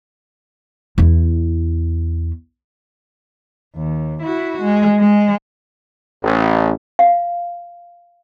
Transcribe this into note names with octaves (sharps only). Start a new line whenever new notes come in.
E2 E4
D#2
E4 F#4
G#3
G#3
A1
F5